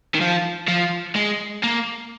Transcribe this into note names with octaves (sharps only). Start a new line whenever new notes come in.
D#3
F3
F3
G#3
A#3